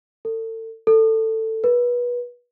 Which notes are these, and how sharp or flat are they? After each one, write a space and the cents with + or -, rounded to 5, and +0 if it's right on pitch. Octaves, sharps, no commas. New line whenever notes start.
A4 +35
A4 +15
B4 -25